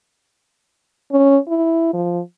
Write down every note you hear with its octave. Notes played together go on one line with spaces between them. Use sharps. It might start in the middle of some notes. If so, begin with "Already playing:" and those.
C#4
E4
F3